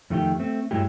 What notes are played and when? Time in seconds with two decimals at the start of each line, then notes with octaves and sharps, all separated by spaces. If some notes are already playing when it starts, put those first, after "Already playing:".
0.10 F2 D#3 A3 F#4 G4
0.40 A3 C4
0.71 G2 F#3 G#3 A3 E4 G4